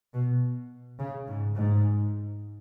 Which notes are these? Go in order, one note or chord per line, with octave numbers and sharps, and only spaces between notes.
B2
C#3
G#2
G#2